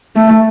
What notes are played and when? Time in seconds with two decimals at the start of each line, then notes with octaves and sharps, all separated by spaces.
0.16 A3